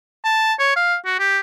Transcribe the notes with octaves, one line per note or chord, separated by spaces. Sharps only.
A5
C#5
F5
F#4
G4